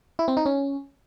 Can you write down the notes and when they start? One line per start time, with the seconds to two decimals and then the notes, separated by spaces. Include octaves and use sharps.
0.19 E4
0.28 C4
0.37 D#4
0.46 C#4